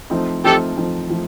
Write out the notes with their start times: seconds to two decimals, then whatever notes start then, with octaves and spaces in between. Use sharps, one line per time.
0.10 F3 A3 C4 D#4
0.44 F3 A3 C4 D#4 G4 A4
0.77 F3 A3 C4 D#4
1.10 F3 A3